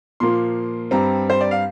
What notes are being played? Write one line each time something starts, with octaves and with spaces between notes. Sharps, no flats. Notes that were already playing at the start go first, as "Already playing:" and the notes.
A#2 F3 A#3 C6
G2 G3 C4 A#5
C5
D5
F5